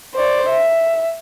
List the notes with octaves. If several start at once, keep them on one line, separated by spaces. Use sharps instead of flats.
C5 D5
E5